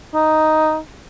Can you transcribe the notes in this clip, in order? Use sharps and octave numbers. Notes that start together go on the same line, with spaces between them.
D#4